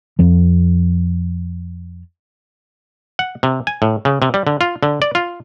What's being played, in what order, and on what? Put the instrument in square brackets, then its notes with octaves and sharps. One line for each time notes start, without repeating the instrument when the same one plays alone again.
[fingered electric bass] F2 F3
[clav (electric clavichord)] F#5
C3
G#5
A2
C#3
C3
G3
D3
F4
D3
D5
F4